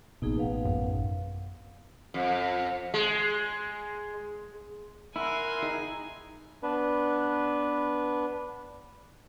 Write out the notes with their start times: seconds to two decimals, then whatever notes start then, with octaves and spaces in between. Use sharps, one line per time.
0.22 A1 B2 A#3 D#4 G#4
0.37 B4 F5 F#5
0.65 F#2
2.14 F2
2.94 G#3
5.16 E4 A#4 F#5 G#5 C6
5.62 D#4 G#4
6.63 B3 D4 B4